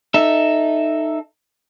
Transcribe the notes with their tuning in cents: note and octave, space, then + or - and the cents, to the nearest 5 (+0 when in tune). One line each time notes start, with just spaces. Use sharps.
D#4 -15 A4 +0 E5 +0